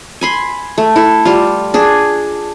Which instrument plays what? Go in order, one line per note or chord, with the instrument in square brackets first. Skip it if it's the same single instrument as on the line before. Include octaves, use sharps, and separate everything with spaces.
[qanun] G#5 B5 C6
A3
E4 A4
G3 F4
D4 G#4